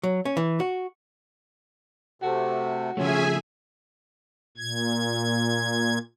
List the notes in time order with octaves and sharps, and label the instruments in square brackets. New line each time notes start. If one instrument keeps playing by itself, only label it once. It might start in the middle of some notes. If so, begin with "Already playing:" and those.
[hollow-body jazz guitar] F#3
C#4
E3
F#4
[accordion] C3 A3 [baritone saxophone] F#4
[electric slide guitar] C#3 F3 A3 [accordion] C#4 [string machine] G#4 E5 G#5
[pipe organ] A#2 G#6